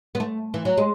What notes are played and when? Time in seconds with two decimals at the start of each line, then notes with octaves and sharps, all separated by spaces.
0.15 B3
0.20 A3
0.54 E3
0.65 F#3
0.77 G#3